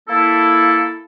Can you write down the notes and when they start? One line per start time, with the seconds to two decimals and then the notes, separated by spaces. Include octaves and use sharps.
0.08 A#3 E4 A4